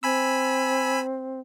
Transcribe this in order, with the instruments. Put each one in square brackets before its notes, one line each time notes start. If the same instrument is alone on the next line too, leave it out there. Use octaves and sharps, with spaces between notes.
[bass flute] C4 [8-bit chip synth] G#5 B5 E6